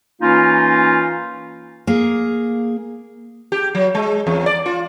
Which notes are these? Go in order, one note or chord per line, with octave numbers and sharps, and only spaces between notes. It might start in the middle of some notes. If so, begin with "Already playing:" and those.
E3 A#3 C#4 D#4 F4
A#3 G#4
G4
F#3
G#3
E2
D5
F4